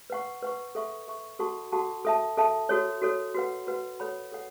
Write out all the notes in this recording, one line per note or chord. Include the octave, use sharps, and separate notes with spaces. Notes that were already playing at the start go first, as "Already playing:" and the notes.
B4 F#5 C#6
B4 F#5 C#6
A4 E5 C#6
A4 E5 C#6
F#4 A4 F#5 A5 C#6
F#4 A4 F#5 A5 C#6
A4 E5 A5
A4 E5 A5
F#4 A4 C#5
F#4 A4 C#5
F#4 B4 F#5
F#4 B4 F#5
A4 C#5 F#5 B5
A4 C#5 F#5